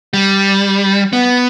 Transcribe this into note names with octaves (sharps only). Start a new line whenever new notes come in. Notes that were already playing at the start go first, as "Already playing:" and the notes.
G3
B3